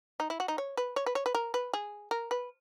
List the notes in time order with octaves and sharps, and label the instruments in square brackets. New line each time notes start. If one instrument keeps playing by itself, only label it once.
[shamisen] D#4
E4
F#4
D#4
C#5
B4
C#5
B4
C#5
B4
A#4
B4
G#4
A#4
B4